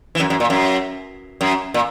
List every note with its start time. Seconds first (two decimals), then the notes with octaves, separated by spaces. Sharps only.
0.15 E3
0.20 F#2
0.30 F#2
0.40 A#2
0.50 F#2
1.41 F#2
1.74 A#2